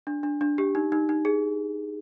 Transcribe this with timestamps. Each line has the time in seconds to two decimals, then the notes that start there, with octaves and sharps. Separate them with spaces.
0.07 D4
0.23 D4
0.41 D4
0.58 G4
0.75 D#4
0.92 D#4
1.09 D#4
1.25 G#4